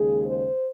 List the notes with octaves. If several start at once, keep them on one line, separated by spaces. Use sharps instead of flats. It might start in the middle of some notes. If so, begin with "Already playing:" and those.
Already playing: D#2 C#3 G#3 G#4
C5